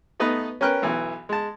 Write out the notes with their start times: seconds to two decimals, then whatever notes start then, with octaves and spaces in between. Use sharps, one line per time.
0.20 A3 B3 D#4 B4 D#5
0.61 C#4 A#4 B4 G5 F#6
0.82 B1 E3
1.29 G#3 A5